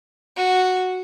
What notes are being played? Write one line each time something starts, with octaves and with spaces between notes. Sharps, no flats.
F#4